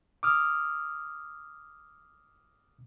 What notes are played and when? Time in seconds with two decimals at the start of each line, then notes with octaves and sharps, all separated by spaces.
0.23 D6 D#6 F6